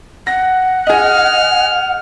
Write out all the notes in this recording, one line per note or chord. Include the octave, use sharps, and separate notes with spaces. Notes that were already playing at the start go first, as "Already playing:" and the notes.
F#5 A#6
G#4 D#5 F6